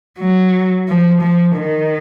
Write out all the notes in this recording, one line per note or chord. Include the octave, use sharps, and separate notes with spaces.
F#3
F3
F3
D#3